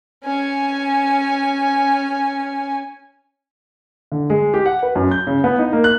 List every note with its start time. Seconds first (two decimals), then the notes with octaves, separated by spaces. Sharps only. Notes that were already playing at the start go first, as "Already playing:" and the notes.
0.24 C#4 G#5
4.12 D3
4.30 G#3
4.54 G4
4.66 F#5
4.83 B4
4.95 F#2
5.11 G6
5.27 C#3
5.44 B3
5.59 D#4
5.73 A#3
5.84 F#6